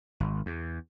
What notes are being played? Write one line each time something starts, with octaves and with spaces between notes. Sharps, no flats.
G#1
E2